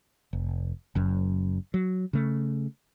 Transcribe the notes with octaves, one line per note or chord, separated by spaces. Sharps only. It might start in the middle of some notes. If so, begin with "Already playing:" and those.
F1
F#1 F#2
F#3
C#3 A3